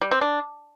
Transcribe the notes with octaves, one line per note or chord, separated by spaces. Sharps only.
G3
C4
D4